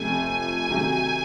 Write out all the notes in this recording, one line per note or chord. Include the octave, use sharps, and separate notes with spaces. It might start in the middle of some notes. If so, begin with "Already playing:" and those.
Already playing: F2 C3 F3 A3 G#5
C3 D#3 F#3 A3